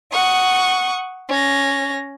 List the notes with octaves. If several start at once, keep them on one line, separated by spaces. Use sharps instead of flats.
F#5 C#6 D#6
C#4 A#6